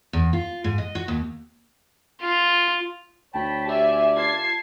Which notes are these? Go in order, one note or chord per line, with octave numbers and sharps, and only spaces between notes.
E2
F4
G#2
D#5
F#4
D#2
F4
D2 C#5 G5 A5 B5
G4 C5 D5 E5 G#5
F4 A5 G#6 C7